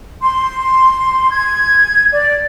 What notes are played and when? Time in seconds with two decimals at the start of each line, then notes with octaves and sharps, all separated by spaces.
0.21 C6
1.32 G#6
2.12 D5